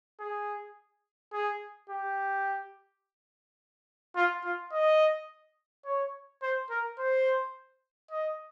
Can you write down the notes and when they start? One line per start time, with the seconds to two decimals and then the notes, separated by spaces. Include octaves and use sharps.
0.20 G#4
1.33 G#4
1.89 G4
4.16 F4
4.44 F4
4.72 D#5
5.85 C#5
6.42 C5
6.70 A#4
6.99 C5
8.11 D#5